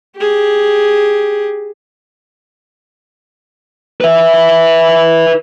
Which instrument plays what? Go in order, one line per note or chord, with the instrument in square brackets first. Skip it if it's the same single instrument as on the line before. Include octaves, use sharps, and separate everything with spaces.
[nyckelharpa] G4 G#4
[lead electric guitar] B4 E5